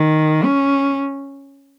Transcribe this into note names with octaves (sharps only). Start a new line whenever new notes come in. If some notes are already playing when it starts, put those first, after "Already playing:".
Already playing: D#3
C#4